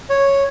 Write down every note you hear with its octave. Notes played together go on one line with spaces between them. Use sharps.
C#5